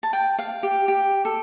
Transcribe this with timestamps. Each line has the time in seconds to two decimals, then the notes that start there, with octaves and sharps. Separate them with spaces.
0.03 A5
0.13 G5
0.39 F5
0.63 G4
0.88 G4
1.25 A4